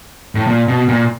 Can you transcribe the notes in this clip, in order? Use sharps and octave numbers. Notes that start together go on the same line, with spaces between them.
A2
A#2
B2
A#2